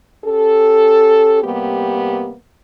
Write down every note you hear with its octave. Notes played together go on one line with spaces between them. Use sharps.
C#4 G4 A4
C3 G3 A#3 B3 G4